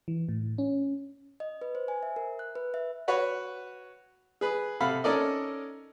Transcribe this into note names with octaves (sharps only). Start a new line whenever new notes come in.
E3
A2
C#4
D#5
B4
C5
G#5
E5
A#4
F#6
B4
E5
F#4 B4 C#5 C#6
G#4 B4
C3 A4 F5 F#5 B5
C#4 D#4 A4 A#4 D5 D#5